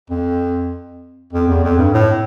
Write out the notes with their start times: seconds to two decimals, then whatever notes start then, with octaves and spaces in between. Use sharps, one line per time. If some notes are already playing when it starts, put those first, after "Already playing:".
0.10 F2
1.33 F2
1.48 E2
1.64 F2
1.79 G2
1.94 A2